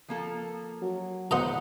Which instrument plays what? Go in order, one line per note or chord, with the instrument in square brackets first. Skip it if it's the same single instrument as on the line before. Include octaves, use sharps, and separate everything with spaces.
[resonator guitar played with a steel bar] F3 A#3 A4
[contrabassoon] F#3
[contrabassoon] E2 [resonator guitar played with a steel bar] B4 F#5 [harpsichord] C5 D#5 A#5